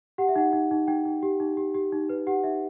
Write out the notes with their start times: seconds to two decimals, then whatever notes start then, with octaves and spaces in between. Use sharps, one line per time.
0.18 G4 F#5
0.28 E5
0.36 D#4 F#5
0.53 D#4
0.71 D#4
0.88 D#4 G5
1.05 D#4
1.23 G4
1.40 D#4
1.57 G4
1.75 G4
1.92 D#4
2.09 B4
2.27 G4 F#5
2.43 D#4 E5